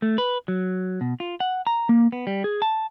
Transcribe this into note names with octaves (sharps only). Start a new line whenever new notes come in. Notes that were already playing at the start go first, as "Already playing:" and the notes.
A3
B4
F#3
B2
F4
F#5
A#5
A#3
B3
G3
G#4
A5